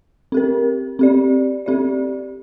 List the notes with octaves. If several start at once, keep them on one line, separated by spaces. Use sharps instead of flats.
C4 G4 A#4
C4 G4 D5
C4 G4 D5